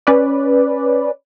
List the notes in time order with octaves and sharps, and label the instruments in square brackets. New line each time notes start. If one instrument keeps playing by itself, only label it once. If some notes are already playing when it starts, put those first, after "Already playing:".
[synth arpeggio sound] C#4 B4 D5